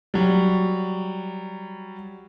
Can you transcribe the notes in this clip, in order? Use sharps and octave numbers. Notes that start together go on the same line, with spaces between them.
F#3 G3